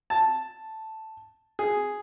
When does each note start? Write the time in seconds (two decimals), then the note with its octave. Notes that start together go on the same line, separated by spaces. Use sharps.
0.10 A5
1.59 G#4